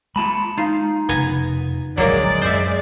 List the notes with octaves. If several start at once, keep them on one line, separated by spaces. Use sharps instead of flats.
G#3 A#3 F4 A5 B5
D#4 F4
F1 C#3 B3 G#5 A#5
D1 A#1 F#3 G#3 A#3 A#4 D5
F#2 C5 E5